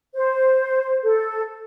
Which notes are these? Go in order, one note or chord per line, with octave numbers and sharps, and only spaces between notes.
C5
A4